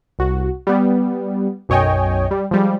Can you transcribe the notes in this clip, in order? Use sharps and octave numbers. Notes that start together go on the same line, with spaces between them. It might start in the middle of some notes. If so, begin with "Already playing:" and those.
C2 F#4
G3 B3
B1 F#2 C#5 D#5 G5 G#5
G3
F3 G3 G#3